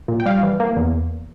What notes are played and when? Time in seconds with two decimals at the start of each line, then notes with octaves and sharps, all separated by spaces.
0.08 A#2
0.20 G5
0.26 G3 F5
0.43 E3
0.60 A#3
0.77 E2